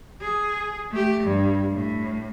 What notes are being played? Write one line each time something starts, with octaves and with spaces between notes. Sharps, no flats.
G#4
A3 G4
G2
A2